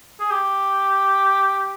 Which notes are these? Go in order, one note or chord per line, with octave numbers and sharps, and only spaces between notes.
G#4
G4